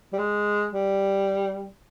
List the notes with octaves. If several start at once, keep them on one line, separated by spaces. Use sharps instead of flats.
G3
G#3
G3